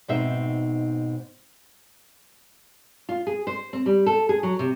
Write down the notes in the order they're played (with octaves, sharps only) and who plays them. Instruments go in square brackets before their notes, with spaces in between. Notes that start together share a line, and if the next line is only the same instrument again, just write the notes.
[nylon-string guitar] G#2 B2 C4 D#4 E5
F4
G#4
C5
C4
G3
A4
G#4
F#3
C3